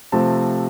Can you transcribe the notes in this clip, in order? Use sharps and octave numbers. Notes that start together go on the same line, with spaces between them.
C3 F3 A3 C4 A5